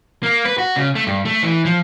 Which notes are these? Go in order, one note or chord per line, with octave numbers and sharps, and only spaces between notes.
A#3
B4
F#4
C#3
A3
G2
A3
E3
F3